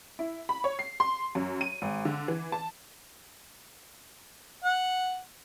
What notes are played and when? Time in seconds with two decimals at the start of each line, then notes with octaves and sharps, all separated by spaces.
0.19 E4
0.49 B5
0.64 C#5
0.79 C7
1.00 C6
1.35 F#2
1.61 D#7
1.82 G#1
2.05 D3
2.28 E3
2.52 A5
4.64 F#5